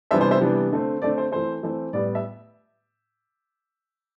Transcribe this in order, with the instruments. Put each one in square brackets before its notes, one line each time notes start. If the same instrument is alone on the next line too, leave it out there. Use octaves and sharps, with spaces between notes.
[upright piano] C3 E3 G3 B3 D4 C5 E5
C5
C5 E5
C3 E3 G3 B3 D4
D3 A3 C4
D3 A3 C4 D5
C5
E3 A3 C4 C5
E3 A3 C4
A2 G3 B3 D5
E5